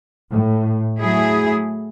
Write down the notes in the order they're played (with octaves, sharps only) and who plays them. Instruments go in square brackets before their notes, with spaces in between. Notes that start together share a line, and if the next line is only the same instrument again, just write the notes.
[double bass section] A2
[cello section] F#3 A3 E4 G#4